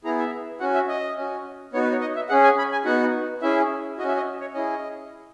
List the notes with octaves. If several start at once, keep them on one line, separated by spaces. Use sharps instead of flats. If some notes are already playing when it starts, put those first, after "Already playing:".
B3 E4 G#4 A#5
E5
C#4 F#4 F#5
E5
D#5
C#4 F#4
B3 D#4 F#4 C#5
B4
C#5
D#5
E5
C#4 G#4 F#5
G#5
B5
G#5
B3 D#4 F#4 F#5
C#4 E4 G#4 E5
C#4 F#4 D#5
E5
D#5
C#5
C#4 E4 G#4 D#5